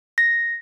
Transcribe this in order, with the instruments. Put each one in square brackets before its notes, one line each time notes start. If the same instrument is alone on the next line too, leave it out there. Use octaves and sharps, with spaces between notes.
[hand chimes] A#6